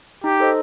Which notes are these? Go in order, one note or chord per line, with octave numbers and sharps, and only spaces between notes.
D#4 G4
A4 C5 D#5